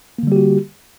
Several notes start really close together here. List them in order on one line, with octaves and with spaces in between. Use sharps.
A#3 D3 G3 G4 F#4